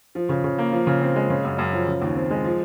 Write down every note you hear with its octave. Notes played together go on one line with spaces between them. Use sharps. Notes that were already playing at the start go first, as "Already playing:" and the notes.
F3
C#3
C#3
A#3
F3
C#3
C4
G#3
C#3
F#2
F#2
F3
C#3
D#2
C4
G#3
F3